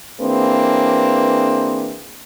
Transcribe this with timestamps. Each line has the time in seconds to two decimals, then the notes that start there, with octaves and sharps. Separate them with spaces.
0.21 E3 A#3 C4 D4 G#4 B4